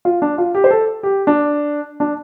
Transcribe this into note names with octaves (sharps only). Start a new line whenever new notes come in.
F4
D4
F4
G4
C5
A4
G4
D4
D4